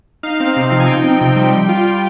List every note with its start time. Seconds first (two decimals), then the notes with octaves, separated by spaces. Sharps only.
0.23 D#4 F5
0.40 C4
0.57 C3
0.72 F3
0.80 G#5
0.88 D#4 G5
1.04 C4
1.21 C3 G5
1.36 G3
1.53 G3
1.69 F4
1.85 G3